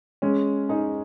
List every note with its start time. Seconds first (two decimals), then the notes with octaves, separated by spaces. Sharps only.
0.22 G#3 C#4
0.69 D#4 G#4